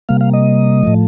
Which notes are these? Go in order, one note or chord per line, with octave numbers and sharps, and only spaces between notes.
C3 G3 A#3 F5
F5
D#5
A2 F3 A3